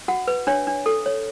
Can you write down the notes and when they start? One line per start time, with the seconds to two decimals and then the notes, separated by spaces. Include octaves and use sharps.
0.08 F#4 F#5
0.27 B4
0.47 D4 C#5
0.67 D4
0.86 A4
1.06 C#5